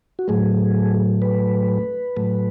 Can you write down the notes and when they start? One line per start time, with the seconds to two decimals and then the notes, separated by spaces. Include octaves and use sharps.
0.19 F#4
0.28 A2 F#3 A3 G#4
1.22 B4
2.17 A2 F#3 A3